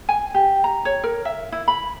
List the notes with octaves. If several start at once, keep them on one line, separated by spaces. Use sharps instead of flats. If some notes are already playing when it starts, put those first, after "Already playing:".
G#5
G4
A#5
C#5
A#4
E5
E4
B5